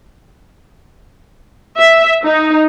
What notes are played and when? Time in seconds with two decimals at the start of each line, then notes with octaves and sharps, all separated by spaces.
1.78 E5
2.24 D#4